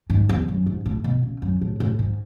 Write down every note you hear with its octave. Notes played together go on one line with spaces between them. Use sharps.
G#2
E2
F#2
G#2
A2
B2
C#3
F#2
A2
A2
G#2